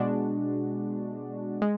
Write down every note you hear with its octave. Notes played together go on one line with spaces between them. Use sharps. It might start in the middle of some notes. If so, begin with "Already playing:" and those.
Already playing: B2 G#3 D4 F#4
G#3